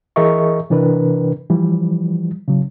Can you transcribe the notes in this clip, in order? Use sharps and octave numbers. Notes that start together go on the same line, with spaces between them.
E3 G#4 A#4 D#5 E5 C#6
C3 E3 D4 A#4 B4
E3 F3 G3
C#3 F#3